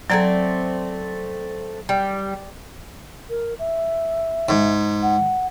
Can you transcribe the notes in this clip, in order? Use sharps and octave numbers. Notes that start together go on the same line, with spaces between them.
F#3 A3 C4 D5 A#5 G#6
G3
A#4
E5
G#2
F#5